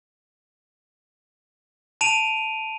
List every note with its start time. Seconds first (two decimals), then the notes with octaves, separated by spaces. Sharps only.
2.01 A5 D7 D#7 F7